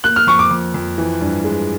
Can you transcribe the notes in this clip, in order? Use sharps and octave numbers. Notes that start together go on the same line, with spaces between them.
A#3 F#6
F6
F2 C#6
D6
F2
F2
E3
G2
G#3